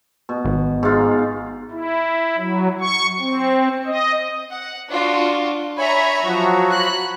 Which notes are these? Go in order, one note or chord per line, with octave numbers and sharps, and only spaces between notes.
B2
G#1
G#2 F4
E4
F#3
C#6
C4
D#5
F#5
D4 F4 F#4
C#5 E5 G#5 A#5 B5
F3 F#3 F#4
B5 F#6